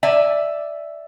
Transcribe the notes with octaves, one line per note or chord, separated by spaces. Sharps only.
D5 E5 G#5